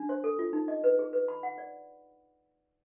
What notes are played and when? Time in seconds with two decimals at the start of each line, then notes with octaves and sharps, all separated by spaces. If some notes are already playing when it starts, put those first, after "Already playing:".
Already playing: D4
0.09 C5
0.24 A4
0.39 F4
0.53 D#4
0.68 D#5
0.84 B4
0.99 G#4
1.13 B4
1.28 B5
1.43 F#5
1.58 D5